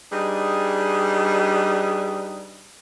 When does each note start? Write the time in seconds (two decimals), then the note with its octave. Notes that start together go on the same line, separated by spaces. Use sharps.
0.12 G3 D4 D#4 G#4 B4